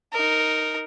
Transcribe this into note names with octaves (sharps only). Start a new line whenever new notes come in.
D#4 A#4